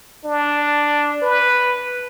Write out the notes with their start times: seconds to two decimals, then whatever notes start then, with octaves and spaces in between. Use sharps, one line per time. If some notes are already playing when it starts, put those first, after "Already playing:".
0.24 D4
1.21 B4